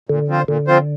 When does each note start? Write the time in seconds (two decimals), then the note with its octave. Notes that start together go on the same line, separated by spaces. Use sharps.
0.09 A#2 D3
0.28 F3 C4 F4 C5
0.48 A#2 D3
0.67 F3 C4 F4 C5